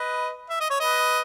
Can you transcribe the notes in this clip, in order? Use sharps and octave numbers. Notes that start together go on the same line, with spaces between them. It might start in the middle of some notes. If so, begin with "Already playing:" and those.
Already playing: B4 D#5
E5
D#5
C#5
B4 D#5